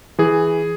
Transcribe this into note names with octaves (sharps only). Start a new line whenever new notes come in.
E3 G#4